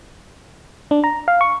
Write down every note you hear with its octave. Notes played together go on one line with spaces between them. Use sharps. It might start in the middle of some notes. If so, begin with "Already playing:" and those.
D4
A#5
F5
C#6